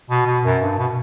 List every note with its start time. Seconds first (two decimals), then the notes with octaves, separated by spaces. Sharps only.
0.10 B2
0.26 B2
0.45 F#2
0.62 G2
0.78 B2